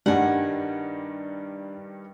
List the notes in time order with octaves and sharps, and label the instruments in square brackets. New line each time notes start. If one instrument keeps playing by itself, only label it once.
[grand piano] G2 D#3 G3 [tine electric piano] D4 [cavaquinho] F#5 G#5